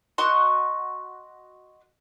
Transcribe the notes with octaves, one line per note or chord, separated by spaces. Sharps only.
F#4 D#5 C6 C#6